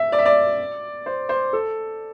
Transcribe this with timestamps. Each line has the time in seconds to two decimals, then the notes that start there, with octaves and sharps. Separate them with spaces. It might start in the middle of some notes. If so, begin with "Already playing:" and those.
Already playing: E5
0.12 D5
0.19 E5
0.25 D5
1.06 C5
1.29 C5
1.53 A4